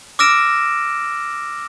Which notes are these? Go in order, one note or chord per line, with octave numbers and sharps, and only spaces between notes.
D6 E6 F6 A#6 D7 E7